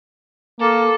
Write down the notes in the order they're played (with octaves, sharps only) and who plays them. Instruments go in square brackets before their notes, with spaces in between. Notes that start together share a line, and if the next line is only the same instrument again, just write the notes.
[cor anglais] A#3 [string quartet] A4